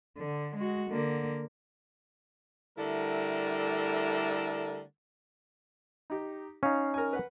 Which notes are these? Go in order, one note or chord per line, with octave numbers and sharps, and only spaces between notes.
D3
G#3 F#4
D3 A#3
D3 G3 A3 E4 A#4
D#4 G4
C#4 D#4 F5
A#4 G#5
B4 F#5